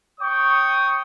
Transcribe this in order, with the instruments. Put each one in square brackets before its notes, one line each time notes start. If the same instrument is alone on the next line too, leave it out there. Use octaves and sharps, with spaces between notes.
[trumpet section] C#5 G5 C#6 D#6